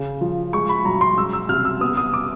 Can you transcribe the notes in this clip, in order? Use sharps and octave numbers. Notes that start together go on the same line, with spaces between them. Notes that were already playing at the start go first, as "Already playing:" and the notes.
Already playing: C#3
F3
G#3 C#6
B5
B1 A#5
C6
G#3 E6
E6
C3 F6
E6
B3 D#6
D#6
D6